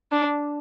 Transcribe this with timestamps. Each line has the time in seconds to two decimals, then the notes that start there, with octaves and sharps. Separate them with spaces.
0.12 D4